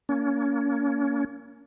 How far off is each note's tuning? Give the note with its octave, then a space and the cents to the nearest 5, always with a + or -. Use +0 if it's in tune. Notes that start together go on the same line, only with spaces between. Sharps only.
A#3 +0 C#4 +35